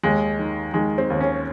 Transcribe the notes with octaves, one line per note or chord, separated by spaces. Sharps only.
D#2 G#3
D#3
D#3 G#3
C4
D#2
C#4